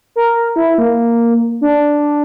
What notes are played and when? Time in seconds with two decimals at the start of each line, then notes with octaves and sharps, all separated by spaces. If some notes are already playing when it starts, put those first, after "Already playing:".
0.16 A#4
0.56 E4
0.78 A#3
1.61 D4